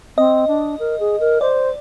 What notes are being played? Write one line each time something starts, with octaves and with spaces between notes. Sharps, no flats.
C4 D#5
D4
A#4
G#4
A#4
C5 D5